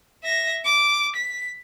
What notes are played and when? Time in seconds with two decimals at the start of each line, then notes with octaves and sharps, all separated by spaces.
0.24 E5 A#6
0.65 D6
1.16 B6